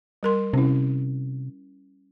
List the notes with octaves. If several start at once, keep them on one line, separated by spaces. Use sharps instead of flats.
G3 A#4 C6
C3 C#4 E4